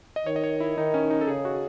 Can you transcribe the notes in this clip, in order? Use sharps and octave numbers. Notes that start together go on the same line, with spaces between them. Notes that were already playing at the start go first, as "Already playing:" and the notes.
D#5
D#3 C#5
D#5
C#5
E4
D#3 D#4
C#4
D#4
A4
C#3 G#4
F#4